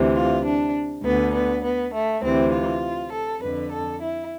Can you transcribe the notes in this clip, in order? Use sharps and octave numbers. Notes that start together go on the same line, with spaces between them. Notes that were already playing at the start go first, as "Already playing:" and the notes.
Already playing: D2 C3 E3
F4
D4
D2 D3 B3
B3
B3
A3
D2 C3 E3 C4
F4
A4
F2 D3 B4
A4
E4